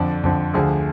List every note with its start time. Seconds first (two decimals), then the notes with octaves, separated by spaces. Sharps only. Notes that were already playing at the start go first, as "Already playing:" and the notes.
Already playing: F2 D3 F3 D5
0.23 F2 D3 F3
0.53 D2 D3 F3 G#4